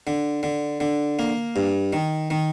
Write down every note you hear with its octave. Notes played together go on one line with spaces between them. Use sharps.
D3
D3
D3
A#3
G2
D#3
D#3